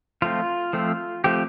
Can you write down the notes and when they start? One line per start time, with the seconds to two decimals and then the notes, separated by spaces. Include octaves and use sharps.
0.22 F3 A3 C4 F4
0.73 F3 A3 C4
1.24 F3 A3 C4 G4